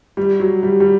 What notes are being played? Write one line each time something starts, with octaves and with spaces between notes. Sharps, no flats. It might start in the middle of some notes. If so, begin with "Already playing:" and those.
G3
F#3
G3
G3